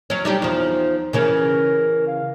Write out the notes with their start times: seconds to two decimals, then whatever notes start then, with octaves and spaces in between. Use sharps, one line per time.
0.10 F#3 C#4
0.25 G3 D4 D#4 G4
0.42 E2 F3
1.13 C#3 E3 C#4 A#4
2.07 F5